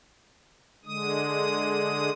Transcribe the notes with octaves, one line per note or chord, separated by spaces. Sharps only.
D3 G#3 D#6